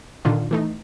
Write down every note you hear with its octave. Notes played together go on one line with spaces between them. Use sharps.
A#2 D3 D#3 F4
E3 A3 D#4